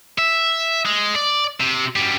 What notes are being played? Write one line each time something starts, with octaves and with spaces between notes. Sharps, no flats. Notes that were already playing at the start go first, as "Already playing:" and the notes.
E5
G#3
D5
C3
F#2 G3